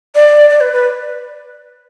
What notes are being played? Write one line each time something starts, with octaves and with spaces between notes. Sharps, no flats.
D5
D5
B4
B4